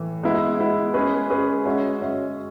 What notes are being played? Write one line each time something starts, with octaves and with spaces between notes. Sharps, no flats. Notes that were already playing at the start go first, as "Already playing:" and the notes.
Already playing: A2 E3
G#3 B3 E4
G#3 B3 E4
G#3 C#4 G#4 B4
G#3 C#4 G#4 B4
G#3 C#4 F#4 C#5 E5
G#3 C#4 F#4 C#5 E5